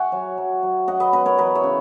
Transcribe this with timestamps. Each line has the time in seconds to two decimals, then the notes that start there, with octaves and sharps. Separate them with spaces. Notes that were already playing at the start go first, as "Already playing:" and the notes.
Already playing: C#5 E5 F#5 G#5
0.12 F#3
0.38 F#3
0.63 F#3
0.88 F#3 D#5 F#5
1.00 B4 D#5
1.13 B2 B4 D#5
1.26 A#4 C#5
1.38 E3 B4 D#5
1.55 C#5 E5
1.64 C#3